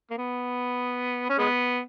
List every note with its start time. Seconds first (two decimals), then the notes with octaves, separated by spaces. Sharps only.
0.11 A#3
0.18 B3
1.30 C#4
1.38 G#3 B3